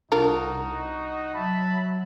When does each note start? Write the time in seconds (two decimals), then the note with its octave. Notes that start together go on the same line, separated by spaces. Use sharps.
0.12 C2 D4 D#4 F4 F#4 A#4
1.35 F#3 E5 A5 B5